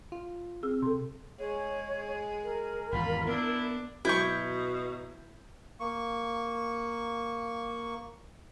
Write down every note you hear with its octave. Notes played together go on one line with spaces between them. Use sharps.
F4
C4 G#4 E6
C3 A4 C6
G#3 G#4 C#5
A#4
G#1 E2 G2 F4 B5
B3 D4 E4
B2 F#3 E4 C#6 G6
A#3 C#6